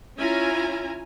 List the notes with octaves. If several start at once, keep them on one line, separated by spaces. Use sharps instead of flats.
C#4 E4 F4 G#5 A#5